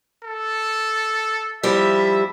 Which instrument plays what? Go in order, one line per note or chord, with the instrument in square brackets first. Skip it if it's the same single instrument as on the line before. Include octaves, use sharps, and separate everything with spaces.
[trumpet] A4
[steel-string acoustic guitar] F3 G3 E4 [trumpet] E5